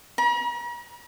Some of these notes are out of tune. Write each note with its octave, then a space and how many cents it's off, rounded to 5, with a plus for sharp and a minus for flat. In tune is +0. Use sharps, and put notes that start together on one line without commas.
A#5 +45